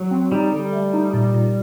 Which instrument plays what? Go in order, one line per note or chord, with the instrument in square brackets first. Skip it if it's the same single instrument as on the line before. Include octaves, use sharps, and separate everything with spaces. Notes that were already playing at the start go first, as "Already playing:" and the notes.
Already playing: [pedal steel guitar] F#3
[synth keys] C4
[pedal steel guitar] G3 [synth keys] D#4
[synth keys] D3 [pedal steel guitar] G3
[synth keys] A3
D#4
A#2
A#2